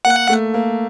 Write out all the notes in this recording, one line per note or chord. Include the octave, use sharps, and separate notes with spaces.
A#3 F#5
A3
A#3